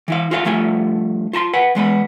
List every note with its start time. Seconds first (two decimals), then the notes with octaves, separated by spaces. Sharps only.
0.08 E3 E4 F5
0.31 F4 F#4 G#4 C#5 D#5 F5
0.45 G2 F3 A3 F4 G#5
1.33 F4 A5 A#5 C6
1.53 B4 F#5 G#5
1.75 E2 G#3 B3 B5